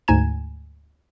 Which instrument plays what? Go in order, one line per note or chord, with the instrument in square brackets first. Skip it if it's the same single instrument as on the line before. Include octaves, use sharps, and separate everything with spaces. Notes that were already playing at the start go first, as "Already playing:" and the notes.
[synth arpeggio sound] D2 G#2 G#5 A#5 G#6 E7